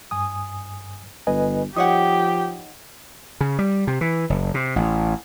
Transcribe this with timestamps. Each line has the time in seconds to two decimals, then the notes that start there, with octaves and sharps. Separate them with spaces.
0.11 G2 G#5 D#6
1.27 G1 B4 D#5 G#5
1.76 F3 D#4 G4 C#5 F#5 D#6
3.41 C#3
3.59 G3
3.87 C3
4.01 E3
4.30 F#1
4.54 C3
4.76 A1